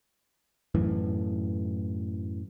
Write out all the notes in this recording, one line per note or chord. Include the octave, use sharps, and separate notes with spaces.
F#2 A2 E3